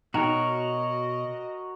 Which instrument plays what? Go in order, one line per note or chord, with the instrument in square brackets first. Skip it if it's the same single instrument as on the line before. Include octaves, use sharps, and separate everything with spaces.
[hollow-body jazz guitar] B2 [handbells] D#4 G5 A#5 [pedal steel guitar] F#4 A#4 C#5 [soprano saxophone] D#5